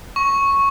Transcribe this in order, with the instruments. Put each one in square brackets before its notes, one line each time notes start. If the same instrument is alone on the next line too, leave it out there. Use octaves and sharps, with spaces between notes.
[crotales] C#6